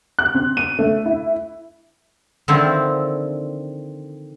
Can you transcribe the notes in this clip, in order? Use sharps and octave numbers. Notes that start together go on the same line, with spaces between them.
F#6
C4
D#7
A3
E4
D3 D#3 F3 C4 E4